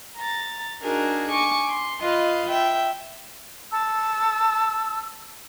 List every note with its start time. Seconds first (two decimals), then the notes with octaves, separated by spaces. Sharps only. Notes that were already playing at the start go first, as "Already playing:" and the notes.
0.17 A#5 A6
0.81 D4 D#4 F#4 G#4 A#4
1.30 G#5 C#6 D6
1.69 C6
2.01 F4 B4 D#5 F5
2.50 E5 G5
3.71 A5 E6